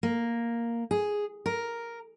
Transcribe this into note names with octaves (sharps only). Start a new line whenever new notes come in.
A#3
G#4
A#4